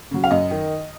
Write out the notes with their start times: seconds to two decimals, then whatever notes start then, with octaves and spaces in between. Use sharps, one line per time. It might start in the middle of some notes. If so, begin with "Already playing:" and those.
0.11 C#3 F#3
0.24 F5
0.31 F#2 D#5
0.51 D#3